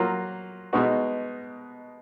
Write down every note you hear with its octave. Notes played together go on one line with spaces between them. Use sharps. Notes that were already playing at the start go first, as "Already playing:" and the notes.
Already playing: F#3 A#3 F4
B2 G#3 B3 D#4 F#4